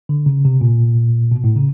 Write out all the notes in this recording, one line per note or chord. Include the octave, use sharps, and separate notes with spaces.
D3
C#3
C3
A#2
B2
A2
C#3